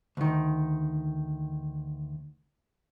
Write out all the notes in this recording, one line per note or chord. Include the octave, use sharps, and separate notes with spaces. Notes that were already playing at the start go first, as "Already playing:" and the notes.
D2 D#3